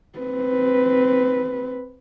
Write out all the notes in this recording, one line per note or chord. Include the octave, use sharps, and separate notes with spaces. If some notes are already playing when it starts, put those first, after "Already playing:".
C4 B4